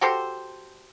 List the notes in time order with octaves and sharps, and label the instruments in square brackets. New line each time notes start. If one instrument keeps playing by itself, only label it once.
[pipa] F#4 G4 A4 C5